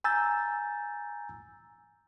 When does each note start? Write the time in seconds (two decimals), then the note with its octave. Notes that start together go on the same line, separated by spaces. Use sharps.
0.04 G#5 A#5 E6 G6 A6